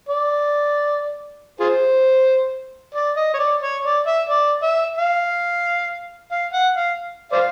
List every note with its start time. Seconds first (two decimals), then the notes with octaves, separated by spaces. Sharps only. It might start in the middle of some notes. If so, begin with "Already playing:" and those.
0.09 D5
1.60 F4 G#4 C5
2.94 D5
3.17 D#5
3.34 C#5
3.39 D5
3.62 C#5
3.84 D5
4.07 E5
4.29 D5
4.63 E5
4.97 F5
6.31 F5
6.53 F#5
6.76 F5
7.32 C5 D5 F5